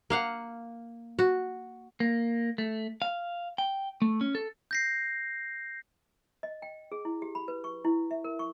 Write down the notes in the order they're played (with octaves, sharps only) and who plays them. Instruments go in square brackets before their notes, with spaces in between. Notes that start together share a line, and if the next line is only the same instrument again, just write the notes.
[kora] A#3 F5 F#5
F#4
[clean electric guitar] A#3
A3
F5
G5
A3
C#4
A4
[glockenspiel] G6 A#6 C7
[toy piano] D#5
G5
G#4
E4
G4
B5
B4
C#6
E4
E5
A#4
C#6